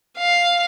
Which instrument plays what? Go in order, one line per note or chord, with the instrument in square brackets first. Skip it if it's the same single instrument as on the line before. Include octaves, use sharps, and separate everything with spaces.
[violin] F5